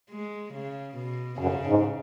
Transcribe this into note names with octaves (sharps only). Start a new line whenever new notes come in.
G#3
C#3
B2
F#2 C#3
G#2